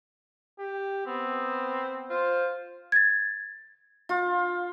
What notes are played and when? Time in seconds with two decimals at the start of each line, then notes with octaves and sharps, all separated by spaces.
0.59 G4
1.07 B3 C4
2.10 F4 C5
2.92 G#6 A6
4.09 F4